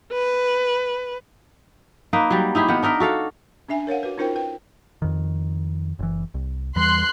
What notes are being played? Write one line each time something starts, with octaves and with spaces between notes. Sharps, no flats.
B4
A#3 D#4 B4
F#3 G3
D#4 E4 G4 G#4
D#3 B3 F#5
D4 D#4 A#4 E5
F#4 A4 F5 F#5
C#4 D4 E5 G#5
A#4 C#5 F5 F#5
F#4 B4
C#4 D#4 F4 A#4 C5 G5
B4 G5
F2 D#3
F#1 E3
C2
E2 E3 G3 C6 F#6